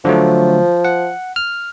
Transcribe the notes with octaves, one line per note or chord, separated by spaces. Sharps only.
D3 F3 F#3 A3
F#5
F6